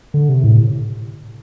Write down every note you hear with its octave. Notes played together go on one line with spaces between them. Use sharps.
D3
C3
A2